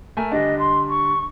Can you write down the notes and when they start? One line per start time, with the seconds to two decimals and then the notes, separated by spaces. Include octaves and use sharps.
0.17 A3 A#4 G#5
0.32 D3 G3 D4 D#5
0.59 C6
0.90 C#6